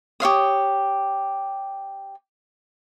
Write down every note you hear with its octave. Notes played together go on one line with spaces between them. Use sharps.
G4 C#5 F5 D#6